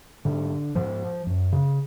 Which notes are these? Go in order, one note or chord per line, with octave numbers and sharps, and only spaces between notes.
G#2 D3
G#2 F3
F#2
C#3